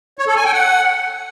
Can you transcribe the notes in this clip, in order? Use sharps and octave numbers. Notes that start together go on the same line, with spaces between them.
C#5
A4
G#5
G5
F#5